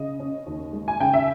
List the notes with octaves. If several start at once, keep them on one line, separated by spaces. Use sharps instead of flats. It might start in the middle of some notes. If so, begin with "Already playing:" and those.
Already playing: C#3 D#5
C#4
D#2
G#3
G#5
C#3 G5
E5